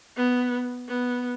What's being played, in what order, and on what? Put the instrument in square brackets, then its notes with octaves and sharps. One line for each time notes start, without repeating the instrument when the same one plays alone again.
[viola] B3
B3